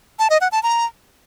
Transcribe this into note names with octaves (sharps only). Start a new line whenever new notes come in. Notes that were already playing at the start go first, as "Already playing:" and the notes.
A5
D#5
F#5
A5
A#5